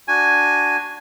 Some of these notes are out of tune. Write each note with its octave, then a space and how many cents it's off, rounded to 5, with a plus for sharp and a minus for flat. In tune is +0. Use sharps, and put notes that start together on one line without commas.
D4 +0 F#4 +5 G#5 +0